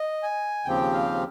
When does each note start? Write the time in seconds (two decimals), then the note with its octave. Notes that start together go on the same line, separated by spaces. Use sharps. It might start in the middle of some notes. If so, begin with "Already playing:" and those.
Already playing: D#5
0.23 G#5
0.65 D#2 C#3 F3 C4 G4 G5
0.93 F5